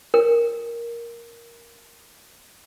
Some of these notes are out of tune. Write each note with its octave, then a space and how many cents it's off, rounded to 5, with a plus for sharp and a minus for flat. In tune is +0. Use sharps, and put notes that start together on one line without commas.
A#4 +5 G5 +40